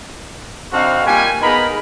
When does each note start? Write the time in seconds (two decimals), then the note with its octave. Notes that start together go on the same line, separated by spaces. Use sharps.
0.73 D3 C4 D#4 F#4 F5
1.07 G3 A#3 F4 G#5
1.42 B3 D#4 G#4 A#4 A#5 B5